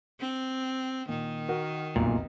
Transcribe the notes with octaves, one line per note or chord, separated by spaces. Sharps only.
C4
A#2 D#3
F#4 A#4 F#5
F1 B1 A#2